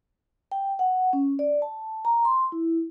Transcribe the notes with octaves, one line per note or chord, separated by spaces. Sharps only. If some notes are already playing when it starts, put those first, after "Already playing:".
G5
F#5
C#4
D5
A5
A#5
C6
E4